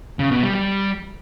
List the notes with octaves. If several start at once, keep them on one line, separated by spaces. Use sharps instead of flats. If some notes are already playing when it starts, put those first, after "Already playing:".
C#3
B2
G3
G3